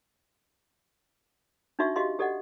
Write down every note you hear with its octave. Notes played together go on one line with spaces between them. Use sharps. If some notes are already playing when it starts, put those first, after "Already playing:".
D4 D#4 F#4 E5 C#6
F#4 G4 D#5 F5 C6
G4 A4 D5 D#5 F#5